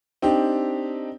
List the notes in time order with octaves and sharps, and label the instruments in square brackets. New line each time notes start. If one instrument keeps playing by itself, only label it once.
[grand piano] C4 D4 D#4 G4